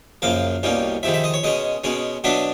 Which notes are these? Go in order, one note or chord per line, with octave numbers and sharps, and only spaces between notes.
F#2 C#3 F3 A#3 F5
C2 B2 G3 A#3 C#4
F2 C3 D#3 G#3 E5
E5
D#5
C#5
B2 G#3 C#4 D#5
B2 G#3 C#4
B2 F#3 B3 D4 E5